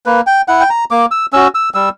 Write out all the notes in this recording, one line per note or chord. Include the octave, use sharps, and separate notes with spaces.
A#3 B4
G5
E4 F#5
G5
A#5
A#3 D6
E6
C#4 F#4 E6
E6
G3 E6